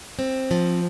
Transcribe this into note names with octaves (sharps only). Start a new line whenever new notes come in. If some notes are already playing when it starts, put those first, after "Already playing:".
C4
F3